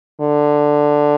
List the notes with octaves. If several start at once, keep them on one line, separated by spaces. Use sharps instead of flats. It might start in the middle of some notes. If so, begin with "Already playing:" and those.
D3